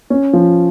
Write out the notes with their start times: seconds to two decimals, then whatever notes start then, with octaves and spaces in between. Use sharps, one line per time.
0.10 C#4
0.33 F3